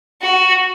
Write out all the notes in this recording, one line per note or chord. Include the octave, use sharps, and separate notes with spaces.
F#4